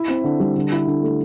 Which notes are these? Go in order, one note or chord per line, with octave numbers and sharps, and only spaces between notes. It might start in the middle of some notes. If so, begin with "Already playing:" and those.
Already playing: E4 E5
C4
D3
G3
D3
E4
D3
A3